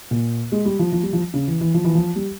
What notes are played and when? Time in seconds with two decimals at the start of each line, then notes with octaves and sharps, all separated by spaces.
0.11 A#2
0.52 G#3
0.65 G3
0.79 F3
0.92 F3
1.03 G3
1.13 F3
1.34 C#3
1.48 E3
1.61 E3
1.74 F3
1.85 E3
1.95 F3
2.16 G3